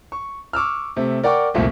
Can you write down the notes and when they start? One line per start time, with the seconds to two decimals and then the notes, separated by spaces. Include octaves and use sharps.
0.12 C#6
0.53 C#6 D6 E6 F6
0.97 C3 A3
1.23 A#4 D5 F#5 G5 C#6 D6
1.54 C2 F2 A#2 A3 C4